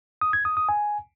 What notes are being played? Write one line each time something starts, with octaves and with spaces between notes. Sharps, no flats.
D#6
G#6
D#6
D#6
G#5